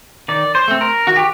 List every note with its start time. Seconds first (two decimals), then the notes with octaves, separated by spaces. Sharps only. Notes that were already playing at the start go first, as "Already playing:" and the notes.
0.28 D#3 D5
0.55 C5
0.68 A3 C4
0.81 A#4
1.07 D#3 F#4
1.16 G4